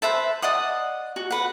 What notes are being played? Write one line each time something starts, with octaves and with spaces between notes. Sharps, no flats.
B4 C5 E5 A5
D5 D#5 F#5 D#6
F#4
B4 F#5